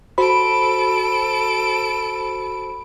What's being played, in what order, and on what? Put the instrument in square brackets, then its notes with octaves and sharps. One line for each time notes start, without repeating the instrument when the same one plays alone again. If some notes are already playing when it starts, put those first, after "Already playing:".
[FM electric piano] F#4 C5 B5 [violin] A4 D7